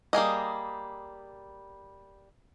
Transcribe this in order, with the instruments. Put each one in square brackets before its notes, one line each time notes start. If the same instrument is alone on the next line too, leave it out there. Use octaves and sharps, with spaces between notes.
[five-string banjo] G3 A#3 G#4 D#5